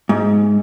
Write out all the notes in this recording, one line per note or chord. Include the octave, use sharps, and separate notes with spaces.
G#2